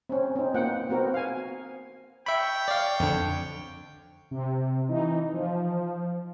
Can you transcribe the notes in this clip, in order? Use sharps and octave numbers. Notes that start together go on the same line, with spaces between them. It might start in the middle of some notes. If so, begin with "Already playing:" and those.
C4 C#4
C4 D#4
A#3 B3 F4 F#5 G5
B3 C4 F#4 A#4
F5 G#5
C#5 E5 G5 B5
D5 F5
F2 D3
C3
E3 D#4
F3